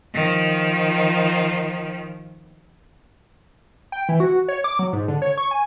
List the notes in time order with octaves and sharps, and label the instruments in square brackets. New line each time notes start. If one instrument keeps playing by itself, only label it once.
[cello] D#3 F3
[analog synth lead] G5
E3
F#4
C#5
D6
F#3
G#2
D3
C#5
C#6
G#5